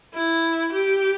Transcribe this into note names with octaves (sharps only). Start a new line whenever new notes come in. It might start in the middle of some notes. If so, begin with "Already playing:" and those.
E4
G4